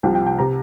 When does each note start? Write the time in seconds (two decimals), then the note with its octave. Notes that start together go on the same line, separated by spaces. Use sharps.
0.03 C2 C3 F3 G5
0.15 G5
0.27 G5
0.39 C3 A#5